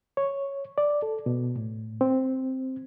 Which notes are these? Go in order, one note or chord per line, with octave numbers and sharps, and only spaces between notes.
C#5
D5
A4
B2
A2
C4